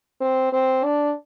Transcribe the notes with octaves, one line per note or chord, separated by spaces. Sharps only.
C4
C4
D4